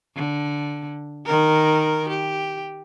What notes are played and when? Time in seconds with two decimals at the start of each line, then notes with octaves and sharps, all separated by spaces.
0.16 D3
1.26 D#3 A#4
2.09 G4